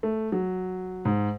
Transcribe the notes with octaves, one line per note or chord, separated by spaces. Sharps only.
A3
F#3
G#2